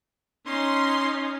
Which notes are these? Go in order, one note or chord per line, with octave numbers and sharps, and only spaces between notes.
C#4 D#4 C6